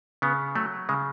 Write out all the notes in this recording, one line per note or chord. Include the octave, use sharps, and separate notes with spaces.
C#3 B3
F#3 A3
C#3 G#3